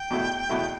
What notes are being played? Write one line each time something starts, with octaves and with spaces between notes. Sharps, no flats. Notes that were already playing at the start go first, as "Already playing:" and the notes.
Already playing: G5
E2 B2 A3 E4
E2 B2 A3 E4